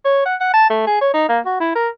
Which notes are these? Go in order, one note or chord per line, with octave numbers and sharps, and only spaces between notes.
C#5
F#5
F#5
A5
A3
G#4
C#5
D#4
A#3
F#4
E4
A#4